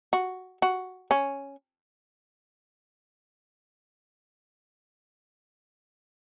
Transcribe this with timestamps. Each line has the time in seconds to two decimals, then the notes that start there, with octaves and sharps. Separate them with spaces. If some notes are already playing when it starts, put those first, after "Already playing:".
0.13 F#4
0.62 F#4
1.11 C#4